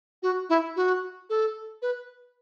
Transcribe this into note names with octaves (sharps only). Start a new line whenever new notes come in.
F#4
E4
F#4
A4
B4